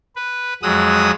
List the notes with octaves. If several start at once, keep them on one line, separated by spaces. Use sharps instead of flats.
B4
F2 F#3 G#3 D#6 E6 F#6